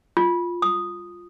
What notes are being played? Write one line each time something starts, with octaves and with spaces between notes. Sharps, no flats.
F4
D#6